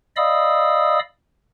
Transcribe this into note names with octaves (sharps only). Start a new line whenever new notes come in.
D5 D#5 F5 B5 D#6 E6